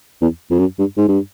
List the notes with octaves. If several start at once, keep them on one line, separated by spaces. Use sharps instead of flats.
E2
F2
F#2
G2
G#2
G2